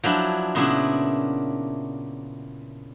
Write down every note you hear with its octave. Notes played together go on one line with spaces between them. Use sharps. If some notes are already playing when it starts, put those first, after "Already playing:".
F3 F#3 D4 E4
A#2 C#3 B3 D4 E4